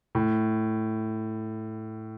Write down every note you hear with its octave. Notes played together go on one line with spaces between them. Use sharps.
A2